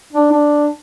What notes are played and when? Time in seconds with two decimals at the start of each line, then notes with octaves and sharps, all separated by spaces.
0.13 D4
0.32 D4